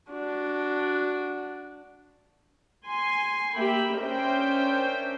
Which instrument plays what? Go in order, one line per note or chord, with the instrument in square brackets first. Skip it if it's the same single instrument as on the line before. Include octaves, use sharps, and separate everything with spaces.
[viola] D4 F#4
[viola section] G#5 C6
A#3 G4 E5 G5 B5
C#4 D4 A#4 C5 E5 G5